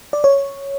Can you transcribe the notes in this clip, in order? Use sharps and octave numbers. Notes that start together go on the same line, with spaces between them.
D5
C#5